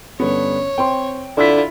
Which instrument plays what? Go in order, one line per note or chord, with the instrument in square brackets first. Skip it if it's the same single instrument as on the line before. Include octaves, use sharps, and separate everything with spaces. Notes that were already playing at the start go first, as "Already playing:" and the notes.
[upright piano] G2 D3 B3 [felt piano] C#4 [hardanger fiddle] C#5
[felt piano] C4 C5 C6 [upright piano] G5
[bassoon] D3 [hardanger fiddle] E4 F4 [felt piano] C6 E6 B6